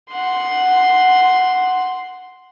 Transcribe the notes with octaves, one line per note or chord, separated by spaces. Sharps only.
F#5 C6